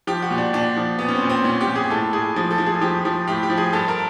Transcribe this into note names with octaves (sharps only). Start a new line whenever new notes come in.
F3 G4
F#4
A#2
D4
A#2 D4
F3
A#2 B3
C#4
C4
A#2
C4
A#2 C#4
G4
A#2
G#4
A2 A4
A2 G#4
F3
A4
F3
G#4
F3 G4
F3
A2 G4
G4
F3
G#4
G2 A4
A#4